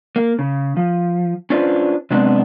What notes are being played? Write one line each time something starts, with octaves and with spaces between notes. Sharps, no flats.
A#3
C#3
F3
C#4 D4 F4 B4 C5
C3 F#3 G#3 B3 C4 D4